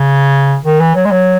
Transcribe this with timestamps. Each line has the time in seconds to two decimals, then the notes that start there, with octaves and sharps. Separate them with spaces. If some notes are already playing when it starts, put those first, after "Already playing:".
Already playing: C#3
0.65 D#3
0.80 E3
0.96 F#3
1.05 G#3
1.11 F#3